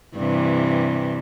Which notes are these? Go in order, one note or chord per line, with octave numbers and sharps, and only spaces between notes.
G2 C3 E3